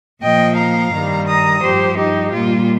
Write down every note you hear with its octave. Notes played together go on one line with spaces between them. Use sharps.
A#2 F3 D#5 G5
F5 A#5
G2 D#3 G3
A#5 D#6
G2 F3 G4 C5
D#4 G4
A#2 G3 F4